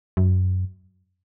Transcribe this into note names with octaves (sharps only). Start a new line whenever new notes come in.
F#2